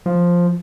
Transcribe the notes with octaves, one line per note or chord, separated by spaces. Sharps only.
F3